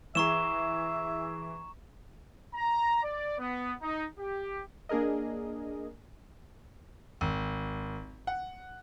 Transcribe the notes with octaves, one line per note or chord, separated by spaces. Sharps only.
E3 G#4 E5 A#5 C#6 E7
A#5
D5
B3
D#4
G4
A#3 D4 G#4 A#4 D#5
G#1
F#5